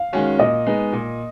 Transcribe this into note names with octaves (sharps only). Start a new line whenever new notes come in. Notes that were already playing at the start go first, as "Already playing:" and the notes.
Already playing: F5
D#3 G#3 C#4 F#4
A#2 D#5
G#3 B3 D#4
A#2